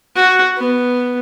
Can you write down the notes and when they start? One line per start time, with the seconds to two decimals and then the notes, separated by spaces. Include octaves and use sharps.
0.16 F#4
0.57 B3